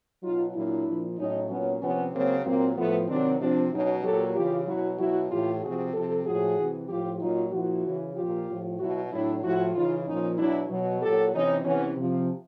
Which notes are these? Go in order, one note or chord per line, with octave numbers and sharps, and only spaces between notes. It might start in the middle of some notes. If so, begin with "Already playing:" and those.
B2 F#3 D#4 F4
A#2 F#3 D4 E4
A#2 F3
A2 F#3 C#4 D#4
A#2 F#3 B3 C#4
C3 F3 B3 C#4
C#3 F#3 A#3 C4
A#2 F#3 A#3 C4
A2 F3 A3 B3
C3 D#3 F#3 C4 D4
C3 F3 C4 D4
B2 F#3 C#4 D#4
A#2 F#3 G4 A4
C#3 E3 F4 G4
B2 F#3 E4 F#4
B2 F#3 E4 F#4
A2 E3 F4 G4
C3 F3 F#4 G#4
C3 F3 G4 A4
A2 F3 F#4 G#4
C3 E3
A2 F3 F4 G4
A#2 F#3 D#4 F4
A#2 F3 E4 F#4
C#3 E3
A#2 F3 F4 G4
A2 F3
B2 F#3 E4 F#4
A2 F#3 D4 E4
A2 F3 E4 F#4
C#3 E3 D#4 F4
A#2 F3 C#4 D#4
B2 F#3 D4 E4
B2 F#3
A#2 F#3 G4 A4
C3 E3 C#4 D#4
C3 E3 B3 C#4
C3 F3